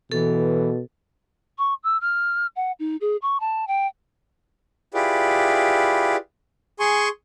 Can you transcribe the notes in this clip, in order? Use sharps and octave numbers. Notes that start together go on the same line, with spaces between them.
B2 E3 A4
C#6
E6
F6
F#5
D#4
G#4
C#6
A5
G5
E4 F4 G4 G#4 B4 D5
G#4 G#5 C6 C#6